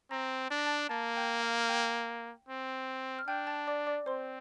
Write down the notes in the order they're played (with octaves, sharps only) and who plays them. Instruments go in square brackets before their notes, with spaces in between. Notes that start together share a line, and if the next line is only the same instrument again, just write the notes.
[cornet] C4 [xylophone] A#5 A#6
[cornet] D4 [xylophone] A6
[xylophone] A#6
A5 A6
[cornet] A#3 [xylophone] A5 A6
[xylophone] G5 G6
F5 F6
F6
G5 G6
[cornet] C4
[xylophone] F6
[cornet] D4 [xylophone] G5 G6
[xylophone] A5 A6
D5 D6
D5 D6
[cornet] C4 [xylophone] C5 C6